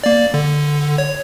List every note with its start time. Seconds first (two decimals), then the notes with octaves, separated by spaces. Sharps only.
0.04 A#3 D5
0.34 D3
0.98 C#5